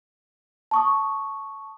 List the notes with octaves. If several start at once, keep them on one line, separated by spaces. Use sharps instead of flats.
A5 C#6 D#6